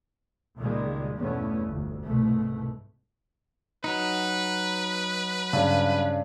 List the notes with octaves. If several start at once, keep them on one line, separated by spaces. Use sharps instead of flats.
C#2 A#2 D#3 G3 G#3
E2 G2 B2 A3 B3 C#4
G1 D2
C2 G#2 B2 A3
F#3 D#4 B4
G2 C#3